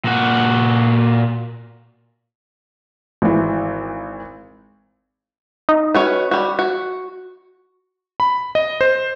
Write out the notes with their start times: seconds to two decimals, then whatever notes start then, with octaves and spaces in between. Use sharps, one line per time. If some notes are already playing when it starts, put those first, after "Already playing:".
0.05 A#2 F#4
3.22 G#1 E3
5.69 D#4
5.95 C#4 F#4 B4
6.31 G3 F#4
6.59 F#4
8.20 B5
8.55 D#5
8.81 C5